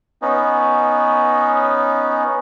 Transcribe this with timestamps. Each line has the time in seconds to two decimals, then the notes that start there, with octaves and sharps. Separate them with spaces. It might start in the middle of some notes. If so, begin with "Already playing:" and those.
0.22 B3 C#4 D#4